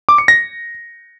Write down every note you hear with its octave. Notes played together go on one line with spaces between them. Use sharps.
D6
C#7
A#6